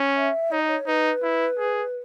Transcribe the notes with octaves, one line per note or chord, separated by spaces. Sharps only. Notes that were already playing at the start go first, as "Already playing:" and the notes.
Already playing: C#4
E5
D#4 C#5
D#5
C#5
D#4 B4
E4
G#4